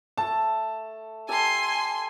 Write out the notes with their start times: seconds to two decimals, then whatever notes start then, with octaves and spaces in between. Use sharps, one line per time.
0.18 A3 A4 A5
1.28 G4 A4 G#5 A#5 C6